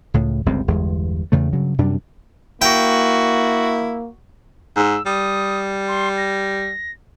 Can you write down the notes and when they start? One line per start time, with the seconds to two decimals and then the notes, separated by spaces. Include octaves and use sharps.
0.14 C#2 A2
0.46 G1 C#2 G3 C4
0.68 G1 E2 G#3
1.32 E2 C#3 A3
1.53 G2 C#3 F#3
1.78 F#2 C3 G3 D4
2.62 A#3 E4 F#4 G5
4.76 G#2 E6
5.06 G3 D#6
5.88 C6
6.17 A#6